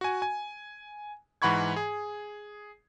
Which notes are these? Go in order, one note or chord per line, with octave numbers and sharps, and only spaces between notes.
F#4 G#5
G#5
G#2 E3 F#5 B5 C#6 G#6
G#4